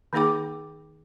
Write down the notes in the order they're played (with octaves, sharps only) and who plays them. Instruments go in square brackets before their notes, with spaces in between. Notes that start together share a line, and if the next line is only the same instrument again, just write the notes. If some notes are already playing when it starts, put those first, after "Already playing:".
[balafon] D#3 A#3 D#4 G#4 G5 D6